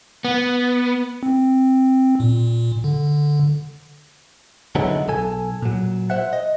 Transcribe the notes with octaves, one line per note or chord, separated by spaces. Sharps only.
B3
C4
A#2
D3
D3 F#3 G#3 B3 D#4 E4
B1 A4 G#5
A#2 F#3
C5 E5 F#5
D#5